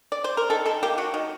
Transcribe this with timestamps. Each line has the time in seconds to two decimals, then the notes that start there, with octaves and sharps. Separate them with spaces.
0.12 D5
0.24 C5
0.37 A#4
0.50 D#3 A4
0.65 D#3 A4
0.83 A#3 G4
0.98 F#3 F#4
1.14 D#3